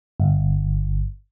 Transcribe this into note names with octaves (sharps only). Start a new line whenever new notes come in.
G1